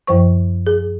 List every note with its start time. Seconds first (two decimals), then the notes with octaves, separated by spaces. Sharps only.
0.07 F#2 F3 C5 C#6
0.67 G#4